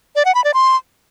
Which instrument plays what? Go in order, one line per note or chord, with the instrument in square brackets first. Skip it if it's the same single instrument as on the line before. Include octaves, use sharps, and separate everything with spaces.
[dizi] D5
F#5
B5
D5
C6